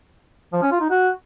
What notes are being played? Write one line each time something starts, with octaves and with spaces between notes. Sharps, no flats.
F3
C#4
F4
D#4
F#4